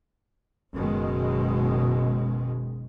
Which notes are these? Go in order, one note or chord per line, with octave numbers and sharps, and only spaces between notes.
F#1 B2 D#3 G#3